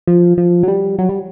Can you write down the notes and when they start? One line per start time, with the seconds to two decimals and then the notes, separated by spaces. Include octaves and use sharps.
0.07 F3
0.38 F3
0.63 F#3
0.68 G3
0.99 F#3
1.09 G3